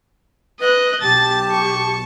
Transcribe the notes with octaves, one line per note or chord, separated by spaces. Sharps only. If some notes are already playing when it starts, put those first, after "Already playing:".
B4 D#5 F#6
B1 G4 A5 A6
C#6